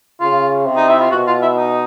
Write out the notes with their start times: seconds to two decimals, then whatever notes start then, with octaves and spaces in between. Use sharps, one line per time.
0.20 C#3 F4
0.65 C3
0.76 D#4
0.88 E4
1.00 F4
1.11 B2 F#4
1.27 F4
1.42 E4
1.57 D#4